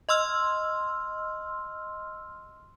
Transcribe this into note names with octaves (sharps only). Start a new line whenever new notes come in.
D#5 C6 E6 F6